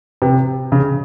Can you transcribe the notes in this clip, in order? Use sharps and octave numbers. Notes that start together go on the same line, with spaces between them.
C3
C#3